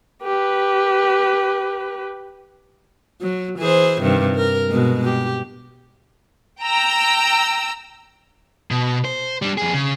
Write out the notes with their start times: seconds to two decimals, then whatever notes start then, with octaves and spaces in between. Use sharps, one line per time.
0.23 G4 B4
3.21 F#3
3.59 E3 G#4 C5
4.01 G2 C3 D#3
4.36 A#4
4.69 B2 G#3
5.04 G4
6.63 G5 A#5 E6
8.71 B2
9.05 C5
9.42 G3 D4
9.58 F2 G#4
9.74 C#3